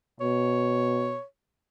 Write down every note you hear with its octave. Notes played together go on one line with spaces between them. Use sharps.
B2 C#5